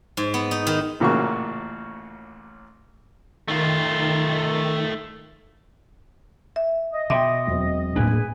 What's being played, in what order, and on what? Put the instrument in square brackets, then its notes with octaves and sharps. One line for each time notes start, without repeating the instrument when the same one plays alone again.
[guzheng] G#2
B3
D#4
D#3
[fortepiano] A1 A#2 C#3 A#3 F#4 C#6
[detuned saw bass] D#3 [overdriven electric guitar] A3 F4
[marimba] E5
[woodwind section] D#5
[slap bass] B2 [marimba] E5 [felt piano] G5 C6 D6
[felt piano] E1 F#3 C4
[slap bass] A2 A#3 D4 [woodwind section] G#4 B4 G#5